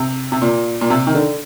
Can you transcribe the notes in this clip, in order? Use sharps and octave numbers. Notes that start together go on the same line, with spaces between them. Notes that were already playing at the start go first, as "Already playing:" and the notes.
Already playing: C3
C3
A#2
A#2
C3
D#3
D3